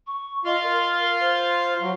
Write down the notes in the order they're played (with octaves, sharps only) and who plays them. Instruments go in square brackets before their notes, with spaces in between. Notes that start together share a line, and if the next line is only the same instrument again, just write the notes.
[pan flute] C#6
[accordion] F4 F5 C6 [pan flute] D#5
[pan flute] A#4
C5
[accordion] F#3